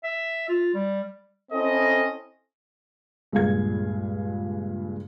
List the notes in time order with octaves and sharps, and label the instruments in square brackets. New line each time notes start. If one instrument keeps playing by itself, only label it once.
[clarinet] E5
F4
G3
[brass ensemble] C4 C#4 E4 A4 D#5
[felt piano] C#2 G2 A#2 G#4 F5 G#6